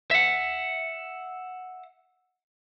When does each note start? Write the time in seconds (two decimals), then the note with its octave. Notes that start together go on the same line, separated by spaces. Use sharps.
0.11 E5 F#5